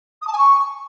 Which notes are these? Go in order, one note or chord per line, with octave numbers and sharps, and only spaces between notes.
D#6
A5
G#5
C#6